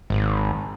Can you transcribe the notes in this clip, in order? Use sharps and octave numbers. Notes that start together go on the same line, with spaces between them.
G#1